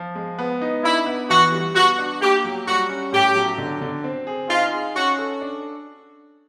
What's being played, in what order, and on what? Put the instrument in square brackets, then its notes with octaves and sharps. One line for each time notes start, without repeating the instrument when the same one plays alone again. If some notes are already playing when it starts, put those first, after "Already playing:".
Already playing: [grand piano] F3
G#3
B3
D#4
[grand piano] D4 [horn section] E4
[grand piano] B3
[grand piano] E3 [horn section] F#4
[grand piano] G3
[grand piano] B3 [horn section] F#4
[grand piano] D4
[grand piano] A#3 [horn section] G4
[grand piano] F#3
[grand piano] G3 [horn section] F#4
[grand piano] C#4
[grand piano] A2 [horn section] G4
[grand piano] F#3
D3
D3
C4
G#4
[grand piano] D#4 [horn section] F4
[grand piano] G#4
[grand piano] C#4 [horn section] F#4
[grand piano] A4
D4